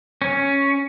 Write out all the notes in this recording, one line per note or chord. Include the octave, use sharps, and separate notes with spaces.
C#4